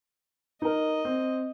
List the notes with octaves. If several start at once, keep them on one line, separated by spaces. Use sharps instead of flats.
D#4 A#4 D#5
C4